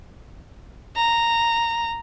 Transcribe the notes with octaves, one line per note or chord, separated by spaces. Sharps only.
A#5